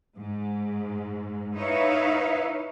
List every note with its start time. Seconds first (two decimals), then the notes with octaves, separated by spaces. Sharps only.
0.15 G#2
1.54 D#4 E4 B4 C#5 E5 F5